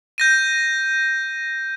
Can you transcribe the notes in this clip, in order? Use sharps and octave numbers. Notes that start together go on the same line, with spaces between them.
G6 A#6 D#7